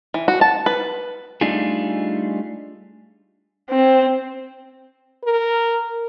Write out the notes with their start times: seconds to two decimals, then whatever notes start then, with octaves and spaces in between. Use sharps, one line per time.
0.14 E3
0.28 F#4
0.41 A5
0.66 B4
1.41 G3 A3 D4 D#4 F4 G#4
3.70 C4
5.24 A#4